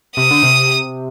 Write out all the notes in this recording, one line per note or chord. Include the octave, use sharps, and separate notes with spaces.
C3 D#6
D3
C3